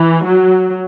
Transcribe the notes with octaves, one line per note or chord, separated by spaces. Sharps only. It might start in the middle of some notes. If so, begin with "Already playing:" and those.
Already playing: E3
F#3